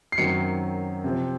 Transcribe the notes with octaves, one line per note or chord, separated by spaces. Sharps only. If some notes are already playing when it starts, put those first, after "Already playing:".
C7
F#2 D#3 F#3 C4 C#7
C3 F3 C4